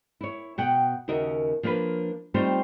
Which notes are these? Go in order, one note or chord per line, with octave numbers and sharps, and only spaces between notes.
E4 C#5
B2 F#5 G5
D#2 C#3 F#4 A#4 D#5 E5
F3 A#3 D4 F4 B4
G3 A3 C4 D#4 F4 C5